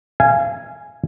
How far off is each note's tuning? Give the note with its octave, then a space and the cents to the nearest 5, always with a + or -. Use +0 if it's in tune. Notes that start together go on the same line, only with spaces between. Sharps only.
F5 -30 G#5 +0